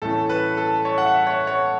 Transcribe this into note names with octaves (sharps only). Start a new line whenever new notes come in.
A2 E3 A3 C#4 A4
B4
A4
C#5
F#5
E5
C#5
C#5